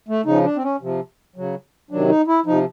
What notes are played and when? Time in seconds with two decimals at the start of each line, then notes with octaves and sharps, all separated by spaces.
0.09 A3
0.26 C#3 F3 D#4
0.44 D4
0.56 C4
0.64 C#4
0.81 C3 F3
1.36 C#3 F#3
1.91 C3 D#3 F#3 D4
2.09 D#4
2.27 E4
2.46 C3 F3 D#4